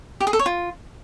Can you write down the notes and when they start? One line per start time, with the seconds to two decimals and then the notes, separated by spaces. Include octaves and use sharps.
0.20 G4
0.27 G#4
0.33 A4
0.39 C#5
0.46 F4